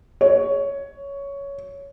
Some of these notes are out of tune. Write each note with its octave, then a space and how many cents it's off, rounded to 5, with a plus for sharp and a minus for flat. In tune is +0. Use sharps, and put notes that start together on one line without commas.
C#5 +10